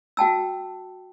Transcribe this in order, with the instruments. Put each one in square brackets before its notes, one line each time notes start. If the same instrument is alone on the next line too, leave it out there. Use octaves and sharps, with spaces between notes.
[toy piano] F#4 G5 A5 E6